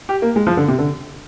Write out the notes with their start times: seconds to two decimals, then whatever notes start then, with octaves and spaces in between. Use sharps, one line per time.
0.09 G4
0.22 A#3
0.36 G#3
0.47 F3
0.57 D3
0.68 C3
0.79 D3